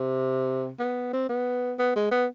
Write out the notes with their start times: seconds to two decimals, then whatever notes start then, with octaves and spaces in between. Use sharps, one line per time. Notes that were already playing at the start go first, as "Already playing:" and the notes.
Already playing: C3
0.79 B3
1.13 C4
1.29 B3
1.79 B3
1.96 G#3
2.11 B3